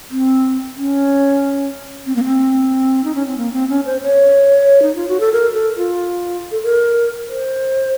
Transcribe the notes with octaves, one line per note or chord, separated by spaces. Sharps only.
C4
C#4
C4
A#3
C4
D#4
C#4
C4
A#3
C4
C#4
C5
C#5
D#4
F4
F#4
A4
A#4
A4
F4
A4
A#4
C5